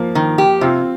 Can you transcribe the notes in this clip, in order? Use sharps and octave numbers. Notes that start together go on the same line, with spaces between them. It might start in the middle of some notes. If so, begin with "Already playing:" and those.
Already playing: F3 A#3
D#3
G4
C3 C4 F4